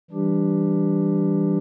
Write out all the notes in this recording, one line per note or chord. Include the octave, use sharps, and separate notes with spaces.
E3 G3 D4 G4